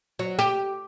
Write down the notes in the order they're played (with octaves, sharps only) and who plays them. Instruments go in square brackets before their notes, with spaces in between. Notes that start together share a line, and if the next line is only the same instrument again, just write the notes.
[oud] F#3
G4